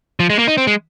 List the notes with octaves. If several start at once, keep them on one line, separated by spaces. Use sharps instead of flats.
F3
G#3
A#3
D#4
C4
G#3